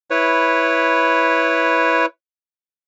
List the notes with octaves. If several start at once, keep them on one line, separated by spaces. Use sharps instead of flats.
E4 B4 C#5